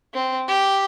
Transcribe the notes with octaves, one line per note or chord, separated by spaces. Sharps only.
C4
G4